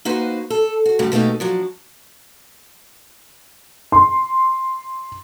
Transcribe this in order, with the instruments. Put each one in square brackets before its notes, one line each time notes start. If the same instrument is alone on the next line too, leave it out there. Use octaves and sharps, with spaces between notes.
[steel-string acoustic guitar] A#3 D#4 F#4 B4 C5
A4
F#4
F#2 A2 C#3 F#3 G3
B2 A3 A#3 D#4 G4
F3 F#3 D4
[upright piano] C6